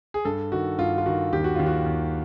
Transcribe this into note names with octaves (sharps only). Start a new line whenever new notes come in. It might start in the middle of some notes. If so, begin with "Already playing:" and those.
G#4
G2 A4
D#3 F#4
G2 F4
F4
D#3 F#4
D#2 G4
F#4
D#2 F4
F#4
D#2